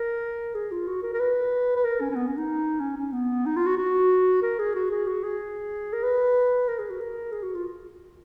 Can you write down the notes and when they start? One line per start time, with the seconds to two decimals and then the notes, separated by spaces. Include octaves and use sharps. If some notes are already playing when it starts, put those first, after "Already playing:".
Already playing: A#4
0.55 G#4
0.71 F4
0.87 F#4
1.03 A#4
1.13 A#4
1.20 B4
1.76 B4
1.84 A#4
2.01 C#4
2.11 C#4
2.16 B3
2.27 C#4
2.37 D#4
2.80 C#4
2.97 C#4
3.13 B3
3.46 D#4
3.56 F4
3.66 F#4
3.77 F#4
4.42 A#4
4.59 G#4
4.75 F#4
4.91 G#4
5.07 F#4
5.23 G#4
5.93 A#4
6.03 B4
6.68 A#4
6.79 G#4
6.90 F#4
7.00 A#4
7.32 G#4
7.43 F#4
7.55 F4